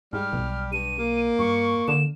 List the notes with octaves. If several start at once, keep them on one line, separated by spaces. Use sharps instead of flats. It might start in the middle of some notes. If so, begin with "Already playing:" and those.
G#2 G3 F6
B1
G2 D#7
A#3
G2 C#6
D3 E7